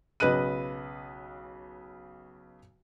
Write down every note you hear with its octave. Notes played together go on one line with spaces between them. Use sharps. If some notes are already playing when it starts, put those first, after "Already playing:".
B1 C#3 B4 D#5 F#6 D#7